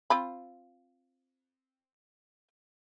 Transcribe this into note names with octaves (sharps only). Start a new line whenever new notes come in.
C4 F4 B5